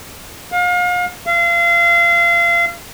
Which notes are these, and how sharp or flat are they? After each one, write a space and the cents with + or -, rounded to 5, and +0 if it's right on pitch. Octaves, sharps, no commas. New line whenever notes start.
F5 +35
F5 -30